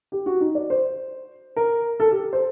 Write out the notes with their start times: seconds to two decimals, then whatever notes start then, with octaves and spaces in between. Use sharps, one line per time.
0.12 G4
0.26 F#4
0.41 D#4
0.55 D5
0.70 C5
1.56 A#4
2.00 A4
2.11 G4
2.33 C5